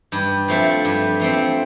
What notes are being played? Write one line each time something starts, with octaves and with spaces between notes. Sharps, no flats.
G2
F3 A3 C4
G2
F3 A3 C4